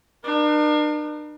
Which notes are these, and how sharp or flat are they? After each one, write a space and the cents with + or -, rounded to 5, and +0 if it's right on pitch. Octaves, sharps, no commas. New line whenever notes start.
D4 +45 A#4 +45